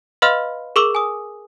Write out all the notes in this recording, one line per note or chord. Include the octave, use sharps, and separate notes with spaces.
B4 D#5 F5 B5 C6 F6
G#4 A#4 C#6 D6 E6 G7
G#5 D#6